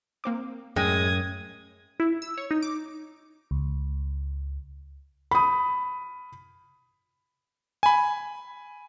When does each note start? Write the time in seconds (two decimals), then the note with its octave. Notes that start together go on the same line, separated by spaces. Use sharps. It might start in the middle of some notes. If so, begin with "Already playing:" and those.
0.24 A#3 C4 D6
0.76 F#2 A2 G#3 G5 D#6 G#6
2.00 E4
2.22 E6
2.38 C#5
2.51 D#4
2.63 D6
3.51 C#2
5.31 B5 D#6
7.83 G#5 B5